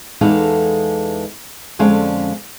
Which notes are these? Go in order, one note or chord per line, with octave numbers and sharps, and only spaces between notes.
E2 E3 G#3 D#4 A4 F5
F2 D3 G#3 C#4 F5